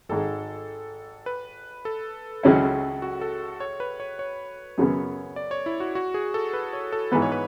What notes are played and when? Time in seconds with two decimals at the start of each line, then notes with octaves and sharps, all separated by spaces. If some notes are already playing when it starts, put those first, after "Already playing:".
0.09 G#1 G#2 G#3 A4
1.26 B4
1.85 A4
2.43 C#2 C#3 F#3 C#4 E4
3.02 F#4
3.21 A4
3.60 C#5
3.80 B4
4.00 C#5
4.19 C#5
4.78 F#2 C#3 F#3 B3
5.36 D5
5.51 C#5
5.66 E4
5.80 F#4
5.95 F#4
6.14 G#4
6.34 A4
6.53 B4
6.73 C#5
6.92 A4
7.12 G#2 E3 B3 B4
7.22 C#5
7.32 B4